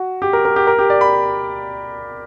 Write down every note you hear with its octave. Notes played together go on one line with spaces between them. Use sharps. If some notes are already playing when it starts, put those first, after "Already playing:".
Already playing: F#4
G4
A#4
A#4
G4
A#4
G4
D5
B5